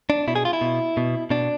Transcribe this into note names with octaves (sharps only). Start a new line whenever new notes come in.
D4
B2 E4
G#4
F4
E4
B2
B2
B2 D4